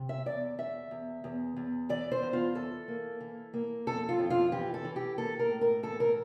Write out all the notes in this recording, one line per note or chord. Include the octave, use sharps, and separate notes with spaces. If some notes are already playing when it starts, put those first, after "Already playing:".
Already playing: C3
E5
E2 D5
E2 E5
E2
E2
E2
E3 D5
C5
E2
F4
E3 A4
A#3
E3
A#3
F2 A4
F4
F2
F4
E3 G4
A4
E3
G4
A#3 A4
A#4
A2
A#4
E3 A4
A#4